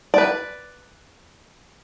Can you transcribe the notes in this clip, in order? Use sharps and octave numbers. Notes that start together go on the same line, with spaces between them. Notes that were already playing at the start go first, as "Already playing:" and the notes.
B4 D5